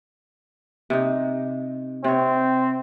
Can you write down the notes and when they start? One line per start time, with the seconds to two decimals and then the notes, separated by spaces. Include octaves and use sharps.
0.90 C3 D#4
2.04 C3 C4 C#5